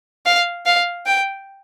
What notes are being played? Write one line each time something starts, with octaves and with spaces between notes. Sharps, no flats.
F5
F5
G5